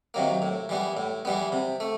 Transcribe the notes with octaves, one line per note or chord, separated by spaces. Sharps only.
C3 D#3 F#3 A#3
A2
E3 G3 B3
A2
E3 G3 B3
C3
A3